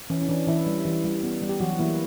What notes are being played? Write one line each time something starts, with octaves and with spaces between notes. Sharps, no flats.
E3 C#4
C#4
E3 D4
E3 E4
G3
E3
G3
B3
G3
G4
E3 F#3 F#4
E3 A#3 E4